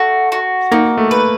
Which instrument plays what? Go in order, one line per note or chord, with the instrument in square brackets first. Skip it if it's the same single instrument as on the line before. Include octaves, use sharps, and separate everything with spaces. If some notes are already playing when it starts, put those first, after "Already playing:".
Already playing: [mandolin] A3 F#4
F#4
[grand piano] A#3 [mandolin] D#4
[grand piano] A3
[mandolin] B4